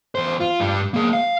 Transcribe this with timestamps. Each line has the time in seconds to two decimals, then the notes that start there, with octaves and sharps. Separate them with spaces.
0.15 E2 C5
0.40 F4
0.60 G2 G3
0.94 A#3 G#4
1.13 F5